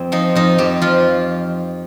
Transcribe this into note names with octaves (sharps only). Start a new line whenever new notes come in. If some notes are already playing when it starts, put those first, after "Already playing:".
Already playing: F2 C4
F3 D#4
F2 D#4
F2 G4
F3 F4